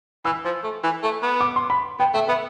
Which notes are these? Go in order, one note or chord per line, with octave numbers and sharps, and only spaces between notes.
E3 E6
F3
A3
E3
A3
B3
D6
C6
B5
B3 G5
A3 E5
B3 E5